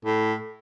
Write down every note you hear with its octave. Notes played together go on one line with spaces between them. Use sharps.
A2